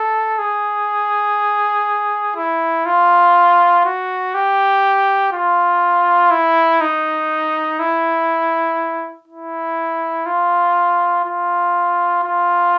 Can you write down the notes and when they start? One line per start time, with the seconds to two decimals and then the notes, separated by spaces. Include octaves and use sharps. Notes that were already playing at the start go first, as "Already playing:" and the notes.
Already playing: A4
0.39 G#4
2.36 E4
2.86 F4
3.85 F#4
4.34 G4
5.33 F4
6.31 E4
6.81 D#4
7.79 E4
9.28 E4
10.26 F4
11.25 F4
12.24 F4